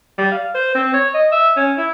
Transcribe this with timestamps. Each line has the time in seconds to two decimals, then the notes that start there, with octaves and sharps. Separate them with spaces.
0.18 G3
0.32 F5
0.55 C5
0.75 C4
0.94 C#5
1.14 D#5
1.32 E5
1.57 C#4
1.78 E4